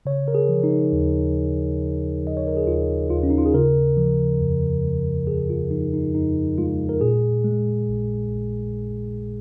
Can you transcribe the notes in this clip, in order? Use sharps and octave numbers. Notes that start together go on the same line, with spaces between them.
C#3 C#5
A#4
G#4
F3
D#4
D#2
D#2
C#3
F3 D#5
C#5
A#4
G#4
D#2 F4
D#2 F4
C#4
D#4
F4
G#4
C#3 A#4
F3
F2
G#3
C#3 G#4
F4
F3 D#4
D#4
F2 D#4
G#3 F4
A#4
A#2 G#4
G#3
A#1
A#1